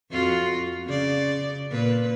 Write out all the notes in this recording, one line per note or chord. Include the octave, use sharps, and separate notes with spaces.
F2 F4 F#4
C#3 D5
A#2 B4